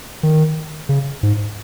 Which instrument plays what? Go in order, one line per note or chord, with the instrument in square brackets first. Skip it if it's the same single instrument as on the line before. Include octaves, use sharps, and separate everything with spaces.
[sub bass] D#3
C#3
G#2